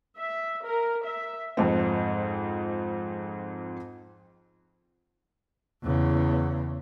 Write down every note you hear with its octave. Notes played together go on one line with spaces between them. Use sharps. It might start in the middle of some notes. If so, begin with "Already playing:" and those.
E5
A#4
E5
F2 G#2 C4
E2 C#3